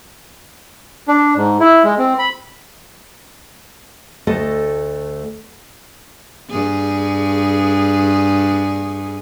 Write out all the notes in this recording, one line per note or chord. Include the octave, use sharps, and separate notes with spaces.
D4
G#2
E4
G#3
C4
B5
D2 A3 F#4 A4 D#5
G2 G#4